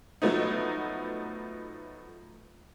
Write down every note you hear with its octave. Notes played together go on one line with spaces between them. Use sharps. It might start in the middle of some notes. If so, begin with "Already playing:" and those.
F3 F#3 A3 B3 D#4